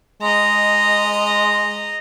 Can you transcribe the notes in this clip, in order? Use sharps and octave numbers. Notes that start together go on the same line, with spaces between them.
G#3 D#5 A#5